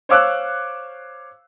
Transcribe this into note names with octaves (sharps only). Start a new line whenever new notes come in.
C5 C#5 F5 D6 E6 F#6